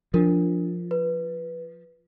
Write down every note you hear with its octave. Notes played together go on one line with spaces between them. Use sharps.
F3 D4 A#4
B4